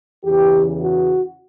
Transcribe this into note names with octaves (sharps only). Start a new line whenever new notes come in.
E2 C#3 E3 G4
F#4